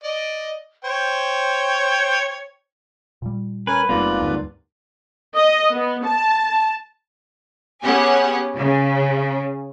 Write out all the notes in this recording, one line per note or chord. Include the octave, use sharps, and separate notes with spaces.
D5 D#5
C5 C#5 G5
A#2 G3
C#4 A#4 B4 G#5
F#1 G#2 C3 G3 A#3 B3 F4 D5
D2 G2
D#5
B3
A5
B3 C#4 G4 G#4 F#5 G#5
C#3